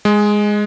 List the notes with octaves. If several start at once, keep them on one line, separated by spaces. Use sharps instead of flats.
G#3